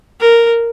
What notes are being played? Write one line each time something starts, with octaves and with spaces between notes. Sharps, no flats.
A#4